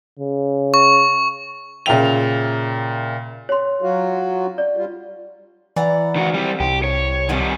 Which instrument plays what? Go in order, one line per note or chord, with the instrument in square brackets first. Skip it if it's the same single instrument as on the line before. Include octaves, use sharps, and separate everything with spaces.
[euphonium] C#3
[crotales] C#6
[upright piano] A#2 C#3 E5 G5 F7
[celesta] C#5 C6
[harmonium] F#3 F4 F#4
[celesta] D5
[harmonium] G3 F4
[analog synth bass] E3 [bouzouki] D5 F#5 A#5
[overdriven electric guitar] D#3 F#4
G3 C4
[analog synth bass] C2 [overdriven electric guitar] G4
[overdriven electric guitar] C#5
[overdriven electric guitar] D#3 G3 [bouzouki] C4 C#4 F#5